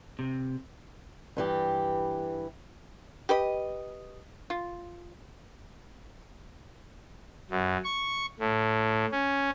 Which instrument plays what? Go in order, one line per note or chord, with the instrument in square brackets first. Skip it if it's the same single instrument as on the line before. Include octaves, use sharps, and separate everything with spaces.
[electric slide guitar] C3
[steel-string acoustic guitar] G2 E3 G4
[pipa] G4 B4 D#5
F4
[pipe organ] F#2
C#6
A2
C#4